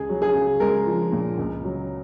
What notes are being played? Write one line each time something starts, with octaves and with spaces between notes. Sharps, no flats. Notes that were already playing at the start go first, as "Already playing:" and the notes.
Already playing: C#2 G#4
F#3
G#4
C#3
G#3 A#4
F3
A#2
C#2
F#3